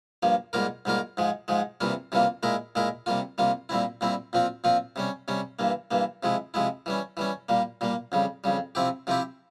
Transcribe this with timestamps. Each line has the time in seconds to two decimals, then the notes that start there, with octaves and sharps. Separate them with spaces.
0.23 G2 F3 A#3
0.53 G#2 G3 A#3 F4 A#4
0.85 G#2 G3 A#3 F4 A#4
1.17 G#2 F3 G#3
1.48 G#2 F3 G#3
1.81 C3 E3 G3 A#3 F4
2.12 C3 E3 G3 A#3 F4
2.43 A#2 G#3 E4 A#4
2.75 A#2 G#3 E4 A#4
3.06 C3 G3 A#3 F4
3.38 C3 G3 A#3 F4
3.69 A#2 G3 C4 E4
4.01 A#2 G3 C4 E4
4.33 A#2 F3 C4 F4
4.64 A#2 F3 C4 F4
4.96 C3 G3 C#4
5.28 C3 G3 C#4
5.59 G2 E3 A#3
5.91 G2 E3 A#3
6.23 C3 F3 G#3 E4
6.54 C3 F3 G#3 E4
6.86 E3 G3 C#4
7.17 E3 G3 C#4
7.49 A#2 G3 A#3
7.81 A#2 G3 A#3
8.12 F2 C#3 G3
8.44 F2 C#3 G3
8.75 C3 F3 C4 E4 G4
9.07 C3 F3 C4 E4 G4